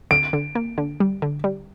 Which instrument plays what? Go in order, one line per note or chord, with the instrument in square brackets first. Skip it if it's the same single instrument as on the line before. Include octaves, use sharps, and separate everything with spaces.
[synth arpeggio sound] D3 [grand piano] D7
[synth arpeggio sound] D3
A#3
D3
G3
D3
G3